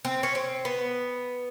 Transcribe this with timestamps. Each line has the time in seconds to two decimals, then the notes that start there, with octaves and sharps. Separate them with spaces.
0.05 C4
0.23 C#4
0.35 C4
0.65 B3